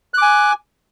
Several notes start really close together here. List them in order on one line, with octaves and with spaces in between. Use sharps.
F#6 D6 G#5